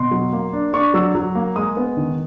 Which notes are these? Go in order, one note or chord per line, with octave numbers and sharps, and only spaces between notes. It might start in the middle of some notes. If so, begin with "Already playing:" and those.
Already playing: B2 C6
F#3
A#3
D4
D4 C#6
F#3 E6
F#3
A#3
G#3 D#6
B3
D#3